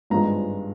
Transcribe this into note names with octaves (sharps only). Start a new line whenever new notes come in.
G#1 G2 F3 G#3 A#5